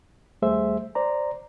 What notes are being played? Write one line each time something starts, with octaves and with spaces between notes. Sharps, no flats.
D#2 G3 A3 G#4 C5 E5
C5 D5 A#5